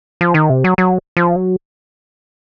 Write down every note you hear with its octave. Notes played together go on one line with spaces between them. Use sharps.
F3
D#3
C3
F#3
F#3
F3
F#3